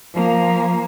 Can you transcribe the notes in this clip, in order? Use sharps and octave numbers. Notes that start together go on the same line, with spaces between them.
F3 A#3